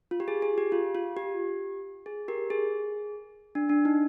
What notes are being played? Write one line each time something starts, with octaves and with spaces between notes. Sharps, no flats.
F4
G4
G#4
G#4
G4
F4
F4
G4
G#4
G4 A#4
G#4
D4
D4
D#4